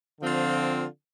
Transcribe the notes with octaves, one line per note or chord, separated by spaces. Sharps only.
D3 F3 C4 F4